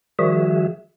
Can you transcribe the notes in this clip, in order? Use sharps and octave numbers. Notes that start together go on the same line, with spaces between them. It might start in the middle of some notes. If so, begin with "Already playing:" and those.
D#3 F3 G3 F#4 G#4 E5